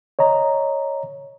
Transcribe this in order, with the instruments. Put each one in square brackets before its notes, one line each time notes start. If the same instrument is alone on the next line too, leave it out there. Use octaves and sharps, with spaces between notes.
[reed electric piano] C#5 D#5 A#5